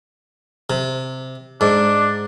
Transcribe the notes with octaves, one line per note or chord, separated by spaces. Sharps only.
C3
G#2 D4